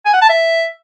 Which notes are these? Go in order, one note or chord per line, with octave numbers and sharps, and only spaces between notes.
G#5
F#5
A5
E5